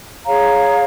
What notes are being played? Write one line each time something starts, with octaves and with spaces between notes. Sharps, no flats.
G#4 C#5 F5 A#5